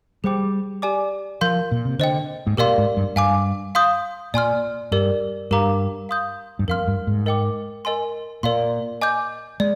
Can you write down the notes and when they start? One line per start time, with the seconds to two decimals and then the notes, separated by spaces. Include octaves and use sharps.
0.24 G3 G#4 C5 G5 D6
0.82 G4 D5 G#5 D6
1.41 F3 A#4 F5 C6 G6
1.71 A#2
1.85 C3
1.99 D3 C5 D#5 G5
2.47 G#2
2.57 A#2 G4 A#4 D5 F5 C6
2.78 G#2
2.97 G2
3.16 G2 F5 G#5 D6
3.75 F5 C6 D#6 G6
4.34 A#2 D5 G#5 C6 F6
4.91 G2 G4 A#4 D5
5.51 G2 G4 A#4 F5 A#5 D6
6.09 F5 C6 D#6 G6
6.59 G2
6.68 F2 A#4 F5 C6 F6
6.87 G2
7.07 G#2
7.26 A#4 D#5 G5 D6
7.85 A#4 D#5 G#5 C6
8.43 A#2 A#4 D5 F5 C6
9.02 D#5 G#5 D6 G6
9.60 G#3 D5